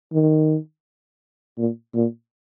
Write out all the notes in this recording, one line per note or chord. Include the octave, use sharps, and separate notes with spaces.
D#3
A#2
A#2